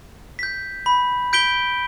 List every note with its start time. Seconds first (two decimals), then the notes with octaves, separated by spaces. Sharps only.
0.39 G6 B6
0.86 B5
1.33 G6 B6 D7 G7